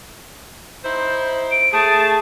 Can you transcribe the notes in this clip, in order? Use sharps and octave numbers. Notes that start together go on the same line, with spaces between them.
D#4 E4 C5
D7
A3 G#4 A5